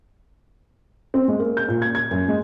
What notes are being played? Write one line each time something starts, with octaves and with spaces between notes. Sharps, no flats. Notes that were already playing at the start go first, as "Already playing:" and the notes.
C4
G#3
A#3
G6
A#2
G#6
G#6
F#2
G#3